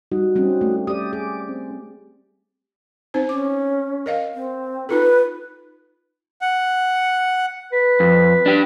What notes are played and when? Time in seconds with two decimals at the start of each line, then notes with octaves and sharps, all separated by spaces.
0.12 G3 D#4 F#4
0.35 G3 C4 C#4
0.61 A3
0.87 G4 D5 D#6
1.13 G#4 D6
1.49 C4
3.14 C4 D#4 C5
3.29 C#4 D6
4.06 A#4 D#5 F5
4.34 C4
4.89 D#4 F4 A4 B4
6.41 F#5
7.72 B4
8.00 F2
8.46 D4 G4